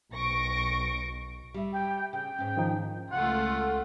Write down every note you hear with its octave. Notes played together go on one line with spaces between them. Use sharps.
B1 C#6 A#6 D7
G3 E5
G5
C#3 G5
G#2 C#4
D#3 F3 D#4
C#2 A3 F4 F#5